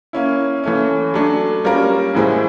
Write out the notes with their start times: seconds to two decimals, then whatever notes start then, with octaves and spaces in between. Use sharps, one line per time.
0.13 A#3 C#4 E4
0.64 E3 A3 C#4
1.14 F#3 A3 D4
1.65 G3 A#3 C#4 F4 A#4
2.15 A2 E3 G#3 C4 E4